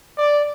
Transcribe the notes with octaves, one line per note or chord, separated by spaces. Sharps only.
D5